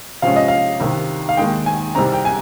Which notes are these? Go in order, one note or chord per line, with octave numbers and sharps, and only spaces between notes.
C3 F3 G#3 C#4 F5
D#5
F5
C2 C3 D#3
F5
D#2 D#3 G#3 G5
G#5
C2 C3 G3 C4 D#4 A#5
G5
G#5